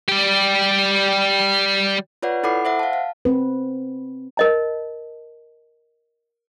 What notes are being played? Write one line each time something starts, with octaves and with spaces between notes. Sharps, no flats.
G3 G4
F4 B4 C#5 D5 F#5
E4 A4 F#5 B5 D6 C7
C5 E5 F#5
F5 A5
F5
C4 B4
A#4 D#5 A5